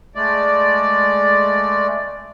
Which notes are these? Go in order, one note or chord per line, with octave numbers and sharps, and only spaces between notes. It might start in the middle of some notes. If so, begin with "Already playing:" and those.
G#3 A3 D5